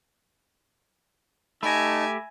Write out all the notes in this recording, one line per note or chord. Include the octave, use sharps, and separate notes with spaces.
A3 D#4 G4 E5 G#5 A5 B5 A#6